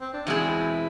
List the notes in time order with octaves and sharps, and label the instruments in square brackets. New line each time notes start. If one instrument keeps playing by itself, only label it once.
[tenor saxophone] C4
D4
[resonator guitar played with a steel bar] E2 B2 G#3 C4 G#4 [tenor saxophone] E4